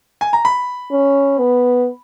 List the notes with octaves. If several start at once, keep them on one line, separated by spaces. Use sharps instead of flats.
G#5
A#5
B5
C#4
B3